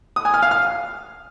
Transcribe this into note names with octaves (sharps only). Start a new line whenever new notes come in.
D#6
G#5
F6
F5
F6